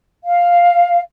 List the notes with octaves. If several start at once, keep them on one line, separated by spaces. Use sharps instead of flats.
F5